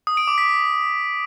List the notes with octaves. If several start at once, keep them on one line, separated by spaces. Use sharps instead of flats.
D#6
D7
D6
B6